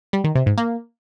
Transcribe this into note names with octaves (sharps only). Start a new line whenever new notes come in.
G3
D#3
C3
G#2
A#3